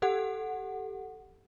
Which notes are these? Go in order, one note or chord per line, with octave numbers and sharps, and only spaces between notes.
G4 A4 F#5